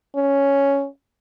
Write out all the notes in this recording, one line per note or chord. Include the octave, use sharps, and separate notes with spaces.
C#4